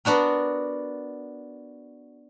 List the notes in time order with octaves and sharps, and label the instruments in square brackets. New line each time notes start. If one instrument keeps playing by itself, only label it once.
[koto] B3 D4 F#4 A#4